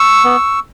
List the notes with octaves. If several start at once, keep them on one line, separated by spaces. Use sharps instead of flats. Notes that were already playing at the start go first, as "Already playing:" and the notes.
Already playing: C#6 E6
B3